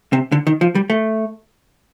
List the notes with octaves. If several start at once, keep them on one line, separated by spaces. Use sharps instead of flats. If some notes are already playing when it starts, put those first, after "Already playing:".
C3
D3
D#3
F3
G3
A3